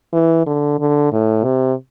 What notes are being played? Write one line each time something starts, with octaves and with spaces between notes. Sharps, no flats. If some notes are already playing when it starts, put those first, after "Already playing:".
E3
D3
D3
A2
C3